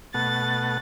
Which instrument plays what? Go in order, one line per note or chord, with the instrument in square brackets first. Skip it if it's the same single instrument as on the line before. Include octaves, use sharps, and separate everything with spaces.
[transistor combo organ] B2 A3 F#5 [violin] A6